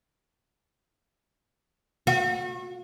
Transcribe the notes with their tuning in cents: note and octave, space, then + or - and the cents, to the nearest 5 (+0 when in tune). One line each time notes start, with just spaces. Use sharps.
F#4 -35